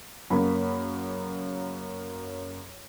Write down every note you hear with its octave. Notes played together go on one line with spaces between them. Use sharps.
F#2 C#3 A#3 B5